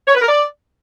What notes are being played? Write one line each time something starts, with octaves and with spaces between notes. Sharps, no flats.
C#5
B4
A#4
D5